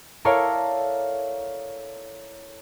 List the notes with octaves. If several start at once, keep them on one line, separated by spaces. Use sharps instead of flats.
E4 A4 A#4 C#5 D5 F5